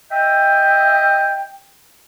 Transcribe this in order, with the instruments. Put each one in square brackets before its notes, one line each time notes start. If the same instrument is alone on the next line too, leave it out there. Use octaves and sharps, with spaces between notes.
[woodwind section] D#5 E5 G5